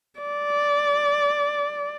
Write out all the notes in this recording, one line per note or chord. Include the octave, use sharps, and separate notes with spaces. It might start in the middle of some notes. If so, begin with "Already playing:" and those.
D5